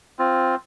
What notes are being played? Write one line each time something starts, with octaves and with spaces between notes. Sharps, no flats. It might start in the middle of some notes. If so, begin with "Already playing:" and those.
C4 F4